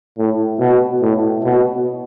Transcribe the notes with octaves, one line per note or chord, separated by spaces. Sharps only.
A2
B2
A2
B2